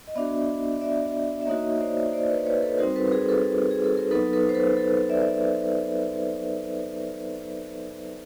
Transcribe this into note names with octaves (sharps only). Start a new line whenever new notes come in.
D#5
B3 D4 F#4 D5 E5
D5 E5
E5
A#3 D#4 F#4 C#5 D#5
C5 D5
C5 D5
B4 C#5
B4 C#5
A4 B4
G3 C4 D#4 F#4 A#4 C5
A4 B4
B4
G#4 A#4
A4 B4
G#4
A4
A#4
F#3 B3 D#4 A4 B4
A4 B4
C5
A4 B4
A4 B4
D5 E5